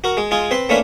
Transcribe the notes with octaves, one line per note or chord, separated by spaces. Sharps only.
F#4 A#4
G#3
G#3 F4 G#4
C4 B4 C6
A3 A#3 C#4 D4 B4